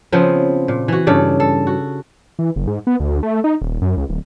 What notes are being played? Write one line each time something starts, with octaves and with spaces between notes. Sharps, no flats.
C#3 F3 B3 C4
A#2
E3 F#4
G2 C#3 A4 D5
A4
F#4
E3
F#1
G#2
B3
D2
A3
D#4
D#1
F#2
C#2
D1